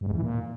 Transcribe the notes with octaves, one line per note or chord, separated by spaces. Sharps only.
G2
G#2
E2
E3
A#2